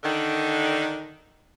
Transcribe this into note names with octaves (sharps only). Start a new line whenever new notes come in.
D3 D#3